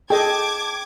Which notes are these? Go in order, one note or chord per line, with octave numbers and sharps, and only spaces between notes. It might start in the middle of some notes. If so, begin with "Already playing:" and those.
G#4 A4 D#5 G5 A5 D6 G#6